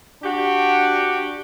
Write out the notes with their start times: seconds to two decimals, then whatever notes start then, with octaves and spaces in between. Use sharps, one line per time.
0.23 D4 F#4 G4